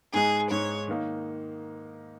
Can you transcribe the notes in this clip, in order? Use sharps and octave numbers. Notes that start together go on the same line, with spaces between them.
G#2 G#3 D#4 G#4
G#2 G#3 D#4 C#5
D#3 A#3 D#4